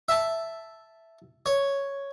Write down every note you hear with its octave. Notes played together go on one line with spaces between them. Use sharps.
E5 A5
C#5